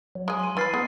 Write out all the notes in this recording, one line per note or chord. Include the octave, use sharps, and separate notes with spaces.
F#3
G#3 G#4
C6 D#7
E3 B4 F6 A6 C7
G#3 B3